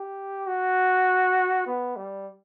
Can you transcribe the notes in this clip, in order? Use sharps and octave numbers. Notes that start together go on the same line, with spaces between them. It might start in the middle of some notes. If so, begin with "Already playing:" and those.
Already playing: G4
F#4
B3
G3